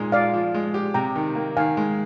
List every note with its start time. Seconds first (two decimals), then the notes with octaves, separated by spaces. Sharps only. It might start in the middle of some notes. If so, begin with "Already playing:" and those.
Already playing: A#2 G#3 D#4
0.12 F4 D5 F5
0.34 F3
0.54 G#3
0.74 G4
0.94 C3 G5 A#5
1.16 D#3
1.35 A#3
1.57 D#3 F5 G#5
1.77 G#3